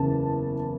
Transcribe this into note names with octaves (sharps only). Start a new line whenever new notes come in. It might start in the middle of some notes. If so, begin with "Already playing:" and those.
Already playing: F#1 E2 C#3 A5